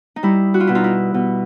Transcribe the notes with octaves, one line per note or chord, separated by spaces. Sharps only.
D#4
G3 E4
F#4
F4
B2 E4
D#4 F4
E4
B2